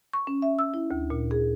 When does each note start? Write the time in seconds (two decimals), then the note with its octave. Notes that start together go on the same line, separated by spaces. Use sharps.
0.13 C#6
0.27 C#4
0.42 E5
0.59 E6
0.74 E4
0.91 D2
1.10 A#2
1.31 G#4